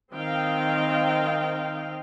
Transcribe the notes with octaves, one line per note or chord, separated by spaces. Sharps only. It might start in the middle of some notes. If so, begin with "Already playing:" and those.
D#3 C4 D#5 F5 G5